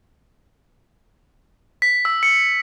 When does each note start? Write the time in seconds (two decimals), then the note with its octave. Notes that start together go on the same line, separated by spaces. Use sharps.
1.82 B6
2.05 E6
2.23 C#7